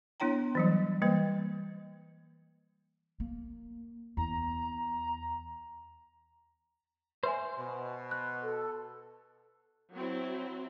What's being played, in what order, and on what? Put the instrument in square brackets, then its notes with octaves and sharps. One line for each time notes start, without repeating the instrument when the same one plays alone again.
[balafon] B3 D4 E4 C#5 G5 A#5
E3 F#3 G3
E3 G3 A#3 B4
[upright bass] A#3
[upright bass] E2 [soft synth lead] A#5
[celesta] B4 E5 G#5 [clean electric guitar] C5
[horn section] B2
[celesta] F#6
[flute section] A4
[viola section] F#3 C4 E4